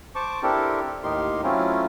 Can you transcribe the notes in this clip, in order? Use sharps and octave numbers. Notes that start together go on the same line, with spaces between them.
C5 A5 C#6 D6
C4 D4 E4 G4 A4 A#4
D#2 A2 D#4 G4 A#4 C6
F#3 A3 C4 C#4 E4 F4